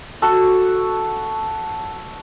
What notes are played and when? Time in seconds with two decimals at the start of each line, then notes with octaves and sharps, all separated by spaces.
0.22 F#4 A4